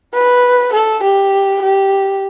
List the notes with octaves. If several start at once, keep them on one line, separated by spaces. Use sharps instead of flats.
B4
A4
G4
G4